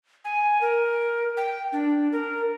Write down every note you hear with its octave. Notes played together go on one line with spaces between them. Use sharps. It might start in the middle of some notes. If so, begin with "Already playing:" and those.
G#5
A#4
G5
D4
A#4